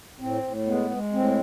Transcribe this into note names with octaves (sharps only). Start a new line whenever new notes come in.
A2 C4
A2
G#3 B3
G#3
A2 C4